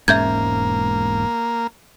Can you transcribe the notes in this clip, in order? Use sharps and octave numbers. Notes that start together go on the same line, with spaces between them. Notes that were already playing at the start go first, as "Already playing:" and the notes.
E1 G#2 A#3 C#4 E5 G6 G#6